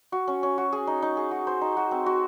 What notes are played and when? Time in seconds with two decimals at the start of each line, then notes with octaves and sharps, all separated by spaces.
0.12 F#4
0.28 C#4
0.43 C#4
0.58 F#4
0.72 G#4
0.87 D#4
1.02 D#4
1.17 G#4
1.31 F#4
1.47 C5
1.61 D#4
1.77 F#4
1.91 C4
2.06 F#4